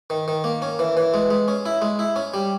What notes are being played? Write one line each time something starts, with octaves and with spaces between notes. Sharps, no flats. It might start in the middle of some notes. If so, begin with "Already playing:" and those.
D#3
D#3
A#3
C#4
E3
E3
G#3
G#3
C#4
E4
G#3
E4
C#4
G3